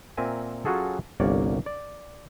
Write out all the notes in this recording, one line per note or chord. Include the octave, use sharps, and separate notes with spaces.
A#2 C4 A#4 E5 G#5
F#3 C#4 F4 F#4 G#4 A4
G1 C2 A#3 C#5 D5
D5